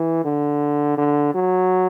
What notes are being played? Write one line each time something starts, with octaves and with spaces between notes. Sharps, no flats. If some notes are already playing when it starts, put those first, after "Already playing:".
Already playing: E3
D3
D3
F#3